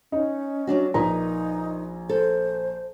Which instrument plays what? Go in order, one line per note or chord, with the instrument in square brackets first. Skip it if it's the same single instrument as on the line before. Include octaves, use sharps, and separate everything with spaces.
[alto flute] C#4 [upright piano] D#4
[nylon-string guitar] F#3 D4 F#4
[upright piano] A#1 A#5 [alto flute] D#4 [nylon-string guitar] A#4 B4 D#5
[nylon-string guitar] A4 [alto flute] C5